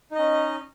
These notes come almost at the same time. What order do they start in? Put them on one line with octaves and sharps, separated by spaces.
D#4 D#5 C#4